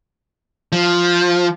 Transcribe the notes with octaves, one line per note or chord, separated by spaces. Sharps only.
F3